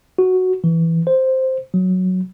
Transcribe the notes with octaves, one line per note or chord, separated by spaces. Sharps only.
F#4
E3
C5
F#3